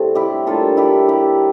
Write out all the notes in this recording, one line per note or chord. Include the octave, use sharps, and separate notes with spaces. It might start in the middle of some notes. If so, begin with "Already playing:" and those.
Already playing: A2 G3 A3 C4 C5
E4 G4
A2 G3 A#3 D4 F4 A4
E4 G4
E4 G4